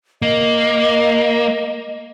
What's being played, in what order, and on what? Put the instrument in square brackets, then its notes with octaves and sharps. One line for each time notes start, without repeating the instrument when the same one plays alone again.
[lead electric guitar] A#3 [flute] D#5